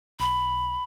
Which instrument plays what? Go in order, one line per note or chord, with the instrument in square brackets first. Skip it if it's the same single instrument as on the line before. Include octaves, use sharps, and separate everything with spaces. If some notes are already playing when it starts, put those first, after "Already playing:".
[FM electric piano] B1 [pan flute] B5